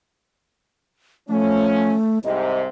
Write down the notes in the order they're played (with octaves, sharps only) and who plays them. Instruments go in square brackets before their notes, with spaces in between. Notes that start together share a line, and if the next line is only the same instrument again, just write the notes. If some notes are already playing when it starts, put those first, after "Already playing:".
[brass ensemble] F3 C#4 [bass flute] A3
[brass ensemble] C2 G#2 C3 [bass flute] D#5